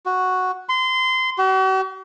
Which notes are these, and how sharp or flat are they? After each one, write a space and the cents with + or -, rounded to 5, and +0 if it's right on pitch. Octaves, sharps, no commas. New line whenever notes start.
F#4 -5
C6 -25
F#4 +45